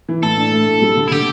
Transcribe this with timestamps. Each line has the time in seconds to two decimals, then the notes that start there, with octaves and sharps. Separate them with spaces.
0.09 E3
0.22 A2 A4
0.37 D4
0.52 A3
0.67 A2
0.82 G3
0.97 D3
1.08 E4
1.11 D3 G4